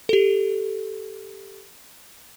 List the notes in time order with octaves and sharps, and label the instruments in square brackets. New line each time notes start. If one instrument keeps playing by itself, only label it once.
[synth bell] G4 A4